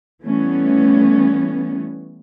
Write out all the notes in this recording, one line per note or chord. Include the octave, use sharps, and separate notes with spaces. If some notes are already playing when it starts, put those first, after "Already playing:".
E3 G3 A3 B3 C#4